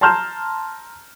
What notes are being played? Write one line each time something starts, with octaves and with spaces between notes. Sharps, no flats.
A5 A#5 C6 F6 G6 E7